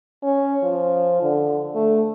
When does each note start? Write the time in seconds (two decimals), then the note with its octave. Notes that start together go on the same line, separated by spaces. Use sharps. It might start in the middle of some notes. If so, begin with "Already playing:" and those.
0.23 C#4
0.63 F3
1.22 D3
1.75 A3